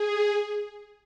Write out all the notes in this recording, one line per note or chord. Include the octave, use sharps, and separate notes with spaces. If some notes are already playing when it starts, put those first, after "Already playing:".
Already playing: G#4